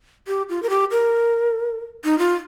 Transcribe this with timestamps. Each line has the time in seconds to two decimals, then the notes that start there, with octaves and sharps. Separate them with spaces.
0.28 G4
0.49 F4
0.63 A#4
0.70 G4
0.91 A#4
2.04 D#4
2.19 F4